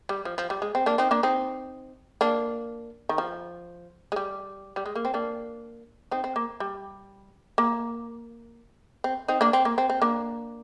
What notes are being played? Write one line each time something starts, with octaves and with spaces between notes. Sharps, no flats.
G3
F3
F3
G3
G#3
C4
A#3 D4
C4 D#4
A#3 D4
C4 D#4
A#3 D4
D#3
F3
G#3
G3
G3
G#3
A#3
C4
A#3 D4
C4 D#4
C4
A#3
G3
A#3
C4
C4 D#4
A#3 D4
C4
A#3
C4
C4
A#3 D4